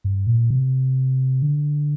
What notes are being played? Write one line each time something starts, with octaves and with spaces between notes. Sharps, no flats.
G2
A#2
C3
D3